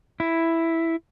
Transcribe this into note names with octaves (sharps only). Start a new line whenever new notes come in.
E4